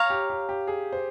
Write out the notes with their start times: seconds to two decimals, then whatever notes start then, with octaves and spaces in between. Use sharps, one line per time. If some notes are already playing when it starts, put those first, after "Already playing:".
Already playing: C#5 F5 A#5
0.10 G4
0.30 G4
0.49 G4
0.67 G#4
0.92 C5